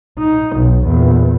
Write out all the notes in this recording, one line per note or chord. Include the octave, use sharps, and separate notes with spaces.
D#4
B1
E2 A#2